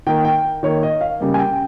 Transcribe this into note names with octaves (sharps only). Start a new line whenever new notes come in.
D#3 A#3 G5
G5
D#3 A#3 C#5
D#5
F5
C#3 G3 A#3
G#5
G5